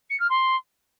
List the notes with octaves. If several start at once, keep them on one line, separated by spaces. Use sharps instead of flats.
C#7
F6
C6